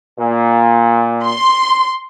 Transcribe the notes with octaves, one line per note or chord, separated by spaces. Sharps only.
A#2
C6